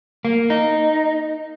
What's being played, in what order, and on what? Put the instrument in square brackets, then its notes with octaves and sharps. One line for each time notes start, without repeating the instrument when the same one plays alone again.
[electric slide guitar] A#3
D#4